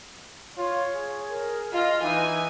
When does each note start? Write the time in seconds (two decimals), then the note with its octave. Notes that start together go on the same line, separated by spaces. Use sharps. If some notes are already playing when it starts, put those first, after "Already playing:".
0.57 F4 C#5
0.95 G#4
1.29 A#4
1.72 F4 D#5
2.03 E3 D#4 G#5